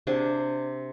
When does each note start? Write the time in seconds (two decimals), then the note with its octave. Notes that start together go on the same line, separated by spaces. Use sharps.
0.07 C3 D4 G#4 A5